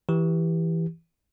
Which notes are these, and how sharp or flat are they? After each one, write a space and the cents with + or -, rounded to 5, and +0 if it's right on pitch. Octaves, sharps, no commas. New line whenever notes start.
E3 +0 G4 +0